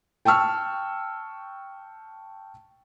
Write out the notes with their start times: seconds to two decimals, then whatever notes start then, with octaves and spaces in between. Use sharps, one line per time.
0.25 G5 A5 C#6 E6 F6